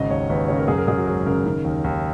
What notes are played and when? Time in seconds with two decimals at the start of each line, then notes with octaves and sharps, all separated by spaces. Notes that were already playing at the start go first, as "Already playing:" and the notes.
Already playing: G#1 C#3 D#5
0.10 D#2 C#5
0.29 D#2 B4
0.48 C#3 C#5
0.58 A#4
0.68 F#2 G#4
0.78 A#4
0.87 F#2 G#4
0.97 F#4
1.07 G#1 G#4
1.26 C#3 A#4
1.46 D#3
1.64 D#2
1.84 D#2